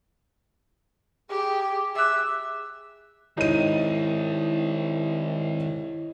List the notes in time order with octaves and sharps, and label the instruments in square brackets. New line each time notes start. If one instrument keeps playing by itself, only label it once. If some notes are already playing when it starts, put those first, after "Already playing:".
[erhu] G4 [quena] G#4
[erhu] E5 [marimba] D6 F#6
[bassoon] C2 [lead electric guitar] D#3 G#3 [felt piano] D#4 D#7 [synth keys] E4 C#5 D#5